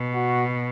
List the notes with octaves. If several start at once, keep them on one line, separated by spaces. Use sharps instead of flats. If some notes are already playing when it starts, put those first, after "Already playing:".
Already playing: B2
F#4